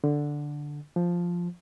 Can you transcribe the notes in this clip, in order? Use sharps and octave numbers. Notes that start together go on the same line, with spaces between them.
D3
F3